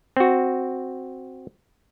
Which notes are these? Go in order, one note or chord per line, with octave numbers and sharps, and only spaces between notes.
C4 F#4